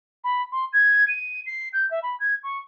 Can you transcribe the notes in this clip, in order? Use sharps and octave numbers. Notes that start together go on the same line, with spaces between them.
B5
C6
G#6
D#7
C7
G6
E5
B5
G#6
C#6